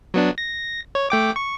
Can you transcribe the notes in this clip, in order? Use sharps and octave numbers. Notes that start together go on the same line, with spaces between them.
F#3 B3 D4
A#6
C#5
A3 G5 D6
C#6